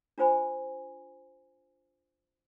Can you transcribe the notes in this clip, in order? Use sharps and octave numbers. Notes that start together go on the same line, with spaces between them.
D4 F4 C5 G#5 B5